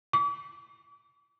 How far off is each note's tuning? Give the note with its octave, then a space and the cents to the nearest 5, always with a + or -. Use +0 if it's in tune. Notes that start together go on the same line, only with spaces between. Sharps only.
D6 -45